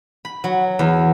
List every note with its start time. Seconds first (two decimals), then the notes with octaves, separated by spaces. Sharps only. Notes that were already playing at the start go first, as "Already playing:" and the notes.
0.25 B5
0.44 F#3
0.79 E2